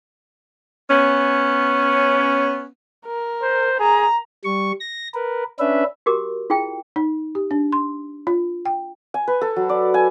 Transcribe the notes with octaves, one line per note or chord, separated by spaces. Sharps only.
B3 C#4
A#4
C5
G#4 A#5
G3 C#6
A#6
A#4 B4
C#4 D4 B4 E5
F#4 G4 A#4 D6
E4 F4 G#4 G5
D#4
G4
D4
C6
F4
G5
G#5
B4
A4
F#3
D5
G#5